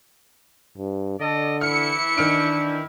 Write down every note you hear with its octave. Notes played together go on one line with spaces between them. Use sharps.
G2
D3 A4 D5 D#5
E3 E4 F6 C#7
D#3 D4 F6 D7